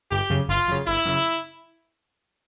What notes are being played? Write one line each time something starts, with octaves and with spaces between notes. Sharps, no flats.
G1 G4
F#2 C#3
G1 F4
F#2 C#3
G1 E4
F#2 C#3